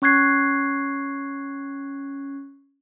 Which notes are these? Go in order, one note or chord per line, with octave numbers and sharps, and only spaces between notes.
C#4 C#6 F#6 G#6 C7